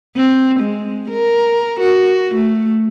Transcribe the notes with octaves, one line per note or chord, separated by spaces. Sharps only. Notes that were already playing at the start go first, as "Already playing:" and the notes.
C4
G#3
A#4
F#4
A3